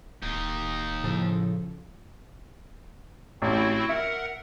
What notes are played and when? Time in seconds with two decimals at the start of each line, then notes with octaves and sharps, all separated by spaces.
0.22 D1 D#2 D#4
1.04 A2 C#3 F3 A4
3.42 A1 C4 E4 F#4
3.89 A#4 E5 F#5